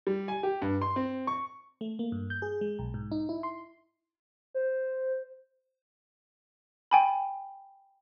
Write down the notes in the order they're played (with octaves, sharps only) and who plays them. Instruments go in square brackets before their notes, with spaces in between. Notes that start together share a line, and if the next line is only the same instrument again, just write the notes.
[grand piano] G3
G#5
G4
G2
C6
C4
C#6
[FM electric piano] A3
A#3
G2
G6
G#4
G#3
B1
G#2
D#4
E4
C6
[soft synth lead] C5
[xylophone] G5 G#5 B5